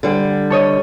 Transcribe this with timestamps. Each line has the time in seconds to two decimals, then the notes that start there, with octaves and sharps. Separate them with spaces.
0.03 D3 G3
0.50 A4 C#5 D#5